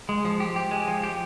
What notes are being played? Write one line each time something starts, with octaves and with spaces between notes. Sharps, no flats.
G#3
F3
G4
G4
G#3
F3
G4